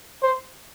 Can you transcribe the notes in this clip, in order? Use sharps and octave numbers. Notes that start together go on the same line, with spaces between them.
C5